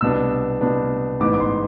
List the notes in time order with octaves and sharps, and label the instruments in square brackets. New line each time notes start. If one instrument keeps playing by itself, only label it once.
[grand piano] C2 B2 B3 D4 E6
C2 B2 B3 D4
A1 G#2 E3 B3 D6
D6
C6